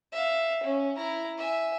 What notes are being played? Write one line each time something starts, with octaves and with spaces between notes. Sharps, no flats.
E5 F5
C#4
E4 A#5
E5 G#5